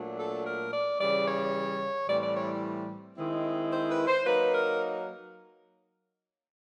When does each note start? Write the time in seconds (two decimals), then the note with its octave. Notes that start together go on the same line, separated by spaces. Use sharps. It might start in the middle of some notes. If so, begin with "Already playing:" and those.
Already playing: A#2 F#3 A3 D4
0.17 A4
0.45 A#4
0.72 D5
0.99 C#3 E3 G3 D5
1.26 C#5
2.08 A2 E3 G3 C4 D5
2.22 D5
2.35 C#5
3.17 D#3 G#3 C4 E4
3.71 C5
3.89 B4
4.08 C5
4.26 F#3 A#3 D#4 B4
4.53 A#4